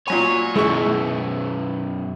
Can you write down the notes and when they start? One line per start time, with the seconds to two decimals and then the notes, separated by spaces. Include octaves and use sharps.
0.08 A#2 F#3 C#5 G#5
0.56 F#2 B2 G#3 E4 C#6